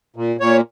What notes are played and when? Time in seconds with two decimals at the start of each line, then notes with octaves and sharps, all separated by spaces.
0.16 A#2
0.40 A#2 C#5